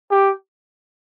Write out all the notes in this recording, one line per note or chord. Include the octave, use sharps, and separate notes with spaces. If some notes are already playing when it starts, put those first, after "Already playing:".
G4